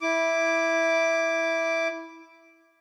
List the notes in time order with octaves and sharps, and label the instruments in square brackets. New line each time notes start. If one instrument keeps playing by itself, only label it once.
[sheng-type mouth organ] E4 D6